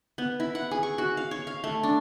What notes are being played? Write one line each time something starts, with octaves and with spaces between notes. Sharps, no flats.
B3
E4
F#5
G#4
C#6
F#4
F5
C#5
F5
A3
D4